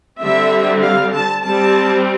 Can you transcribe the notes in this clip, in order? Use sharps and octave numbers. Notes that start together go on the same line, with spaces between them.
D3 G3 C4 E5
F5
A5
G3 C4 A5